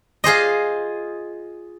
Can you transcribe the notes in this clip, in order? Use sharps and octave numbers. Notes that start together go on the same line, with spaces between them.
F4 G#4 C5 D#5